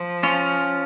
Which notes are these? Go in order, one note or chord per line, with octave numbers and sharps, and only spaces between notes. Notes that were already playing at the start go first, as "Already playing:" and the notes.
Already playing: F3
C#4 F4